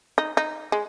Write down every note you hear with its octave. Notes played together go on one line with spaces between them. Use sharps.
D#4
D#4
G#3